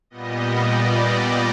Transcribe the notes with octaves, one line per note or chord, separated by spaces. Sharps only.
A#2 G3 B3 D#5
D5